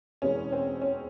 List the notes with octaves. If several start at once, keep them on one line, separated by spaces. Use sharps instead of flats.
E2 B2 G#3 C#4
C4
C#4